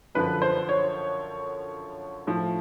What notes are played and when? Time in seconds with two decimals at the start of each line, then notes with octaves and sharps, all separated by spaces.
0.15 F#2 D3 F3 B4
0.42 C5
0.69 C#5
2.27 A2 F3